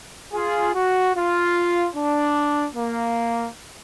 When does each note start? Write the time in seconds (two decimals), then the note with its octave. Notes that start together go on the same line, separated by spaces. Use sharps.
0.33 F4 G#4
0.73 F#4
1.14 F4
1.94 D4
2.74 A#3